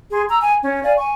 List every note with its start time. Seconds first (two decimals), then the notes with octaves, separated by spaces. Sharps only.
0.11 G#4 C6
0.29 A#5 E6
0.42 G#5
0.62 C#4
0.83 D5 F5 G#5
0.97 G#5 C#6